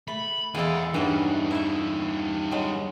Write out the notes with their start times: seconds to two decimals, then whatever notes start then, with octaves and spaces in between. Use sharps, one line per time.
0.08 A3 B5
0.55 E2 G#3 B3 E4 A4 F5 G#5
0.94 G2 E3 F#3 G3 C#4 D#4
1.51 E4 E5
2.51 F#3 G#3